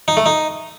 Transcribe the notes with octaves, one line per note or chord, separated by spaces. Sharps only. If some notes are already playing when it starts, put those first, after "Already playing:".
D#4
A3
D#4